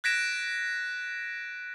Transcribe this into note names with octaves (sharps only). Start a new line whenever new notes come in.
F#6 G#6 A#6 B6 D7 E7